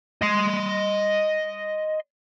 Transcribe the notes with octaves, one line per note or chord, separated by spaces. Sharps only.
D#5 C6